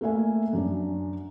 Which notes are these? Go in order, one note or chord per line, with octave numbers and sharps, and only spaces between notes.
A3 A#3 E5 G#5
F#2 D4